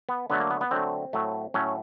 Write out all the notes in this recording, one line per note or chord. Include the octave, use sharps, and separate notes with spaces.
B3
D3 F#3 A3 B3
A#3
B3
B3
D3 F#3 A3 C4
A2 F#3 A3
A2 F#3 A3 C#4